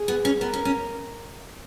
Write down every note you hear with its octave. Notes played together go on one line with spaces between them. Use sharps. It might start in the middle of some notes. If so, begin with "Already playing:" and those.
Already playing: G#4
B3
C#4
B3 A#4
C#4
C#4